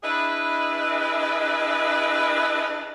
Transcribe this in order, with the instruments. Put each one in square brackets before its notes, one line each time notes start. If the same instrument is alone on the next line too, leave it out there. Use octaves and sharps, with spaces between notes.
[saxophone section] D4 E4 G#4 B4 D#5 E5